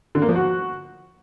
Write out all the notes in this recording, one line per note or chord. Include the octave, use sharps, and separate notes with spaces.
D3
A#3
F3
F#4